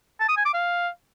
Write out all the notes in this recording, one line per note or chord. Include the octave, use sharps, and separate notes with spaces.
A5
D#6
G#5
D6
F5